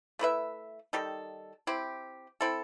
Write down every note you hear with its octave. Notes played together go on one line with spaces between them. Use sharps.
A3 E4 B4 E5
D#3 G3 D#4 A4
C4 E4 G4
C4 E4 A4